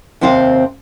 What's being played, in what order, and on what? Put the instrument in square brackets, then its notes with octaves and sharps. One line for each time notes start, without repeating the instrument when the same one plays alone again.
[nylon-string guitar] D#2 C3 C4 C5 F5